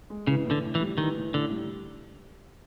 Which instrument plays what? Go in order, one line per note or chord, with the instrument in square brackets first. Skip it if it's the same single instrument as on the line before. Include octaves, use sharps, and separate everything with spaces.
[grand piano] G#3
[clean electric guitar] C#3 [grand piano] E3
[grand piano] A2
[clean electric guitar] D3
[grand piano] A2
[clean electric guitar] E3
[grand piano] G3
[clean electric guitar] D#3 [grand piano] E3
[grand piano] A2
[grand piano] A2 [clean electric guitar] D3
[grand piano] G3